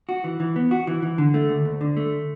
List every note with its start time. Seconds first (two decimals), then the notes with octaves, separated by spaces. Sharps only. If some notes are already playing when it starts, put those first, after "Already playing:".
0.09 F#4
0.24 E3
0.40 E3
0.56 B3
0.71 F#4
0.87 E3
1.03 E3
1.18 D3
1.34 A3
1.49 D2
1.65 D2
1.81 D3
1.97 A3